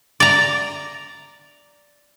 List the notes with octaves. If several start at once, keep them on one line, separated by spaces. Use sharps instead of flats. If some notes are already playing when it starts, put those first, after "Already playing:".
D5 A#5